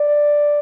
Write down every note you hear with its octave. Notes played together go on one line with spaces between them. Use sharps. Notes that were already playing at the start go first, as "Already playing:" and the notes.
Already playing: D5